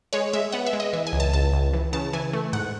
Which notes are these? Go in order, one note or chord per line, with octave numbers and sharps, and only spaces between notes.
G#3 C#5
G#3 E5
B3 F#5
E5
G#3
D#5
E3 E5
G#5
C#2
A5
C#2 A5
C#2
E3
C#3 A5
E3 G#5
A3
G#2 F#5